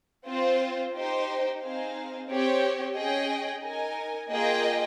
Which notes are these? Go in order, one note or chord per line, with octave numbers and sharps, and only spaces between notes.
C4 F4 C5
D#4 G4 C5
C4 D#4 G#4 C5 F5
C4 G4 C#5
C#4 G#4 D#5 G5
D#4 A#4 D#5 G#5
A#3 F4 G#4 D#5 G5